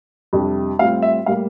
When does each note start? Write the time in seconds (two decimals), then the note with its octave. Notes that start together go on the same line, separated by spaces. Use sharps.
0.33 F2 C3 G3 D4
0.79 A2 G3 C4 F4 F5
1.02 E5
1.26 A2 G3 A#3 F5